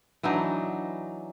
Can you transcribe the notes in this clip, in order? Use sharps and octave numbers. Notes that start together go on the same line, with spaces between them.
E3 F#3 D4 D#4